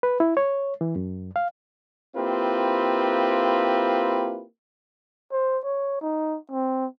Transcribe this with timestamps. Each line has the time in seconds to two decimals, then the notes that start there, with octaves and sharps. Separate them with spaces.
0.03 B4
0.20 E4
0.37 C#5
0.81 E3
0.96 F#2
1.36 F5
2.16 A#3 C4 E4 F4 G4 B4
5.32 C5
5.64 C#5
6.01 D#4
6.52 C4